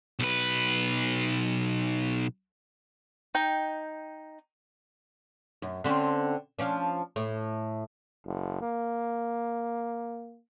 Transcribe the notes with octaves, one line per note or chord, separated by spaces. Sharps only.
B1 B4
D#4 G5
F#2
D3 C4 C#4
F3 C#4 D4
A2
F#1
A#3